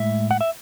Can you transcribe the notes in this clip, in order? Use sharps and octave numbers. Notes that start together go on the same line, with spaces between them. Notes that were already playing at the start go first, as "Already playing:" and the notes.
Already playing: A2 G#3 E5
F#5
E5